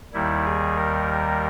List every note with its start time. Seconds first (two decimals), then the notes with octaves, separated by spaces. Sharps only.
0.13 D#2 D#3 G3 E4
0.44 G#4
0.76 A#4